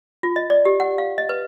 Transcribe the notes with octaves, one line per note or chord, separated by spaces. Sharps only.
F4
D#5
D5
G4
F#5
F5
D#5
B4